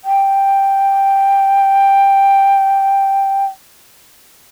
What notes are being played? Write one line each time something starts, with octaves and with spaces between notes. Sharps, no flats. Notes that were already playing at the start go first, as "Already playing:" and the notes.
G5